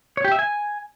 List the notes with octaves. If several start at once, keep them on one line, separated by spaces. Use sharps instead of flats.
C#5
G4
E5
G#5